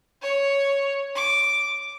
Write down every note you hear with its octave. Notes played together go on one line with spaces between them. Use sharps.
C#5
D6